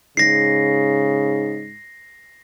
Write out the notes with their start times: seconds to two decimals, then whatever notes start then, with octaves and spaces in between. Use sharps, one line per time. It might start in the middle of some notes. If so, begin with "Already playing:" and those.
0.17 G#2 C#3 A#6 C7